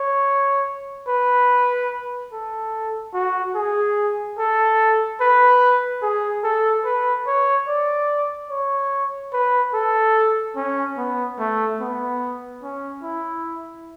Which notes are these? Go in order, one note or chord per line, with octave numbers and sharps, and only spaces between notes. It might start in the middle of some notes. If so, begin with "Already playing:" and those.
Already playing: C#5
B4
A4
F#4
G#4
A4
B4
G#4
A4
B4
C#5
D5
C#5
B4
A4
C#4
B3
A3
B3
C#4
E4